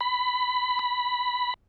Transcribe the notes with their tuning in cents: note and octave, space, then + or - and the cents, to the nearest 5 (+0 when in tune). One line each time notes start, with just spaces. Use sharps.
B5 +15
B5 +0